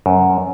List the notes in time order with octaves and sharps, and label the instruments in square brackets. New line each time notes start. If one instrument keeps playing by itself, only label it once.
[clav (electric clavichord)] F#2